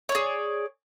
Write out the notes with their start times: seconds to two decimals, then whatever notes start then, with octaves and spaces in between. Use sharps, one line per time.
0.09 C#5
0.12 D5
0.15 G#4